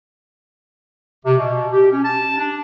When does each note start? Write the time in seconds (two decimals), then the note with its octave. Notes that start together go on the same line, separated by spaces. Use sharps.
1.25 C3
1.37 B2
1.72 G4
1.91 C#4
2.05 A5
2.38 D4